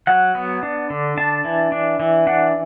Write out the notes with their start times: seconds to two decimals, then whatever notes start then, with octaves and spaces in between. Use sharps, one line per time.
0.07 F#3 F#5
0.35 B3
0.63 D4
0.90 D3
1.17 D4 A5
1.45 E3
1.72 D4
2.00 E3
2.27 D4 F#5